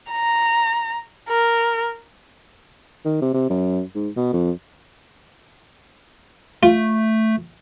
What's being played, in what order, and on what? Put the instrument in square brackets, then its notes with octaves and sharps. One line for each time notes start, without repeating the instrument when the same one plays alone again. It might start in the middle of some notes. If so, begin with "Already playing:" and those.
[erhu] A#5
A#4
[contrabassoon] D#3
C3
C3
F#2
G#2
B2
F2
[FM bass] A3 [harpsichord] F4